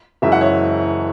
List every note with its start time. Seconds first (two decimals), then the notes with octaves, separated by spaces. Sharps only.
0.22 F#1 F#2 E3 G#3 E5
0.32 F#5
0.41 C#5 E5